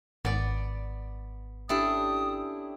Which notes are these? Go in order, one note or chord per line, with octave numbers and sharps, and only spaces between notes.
G#1 B3 D5
C#4 D4 E4 G4 A4 D#6